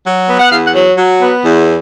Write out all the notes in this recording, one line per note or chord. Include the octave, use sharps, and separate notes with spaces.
F#3
B3
F#5
E2 F5
F#5
F#3
F#3
B3
E2